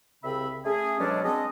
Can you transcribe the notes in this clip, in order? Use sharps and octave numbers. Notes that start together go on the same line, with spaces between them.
C2 C#3 C4 E5 B5
A3 C#4 G#4
B2 F#3 G#3 C#4 D4
G#3 C4 D4 D#5